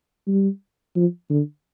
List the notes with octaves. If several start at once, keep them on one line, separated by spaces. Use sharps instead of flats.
G3
F3
D3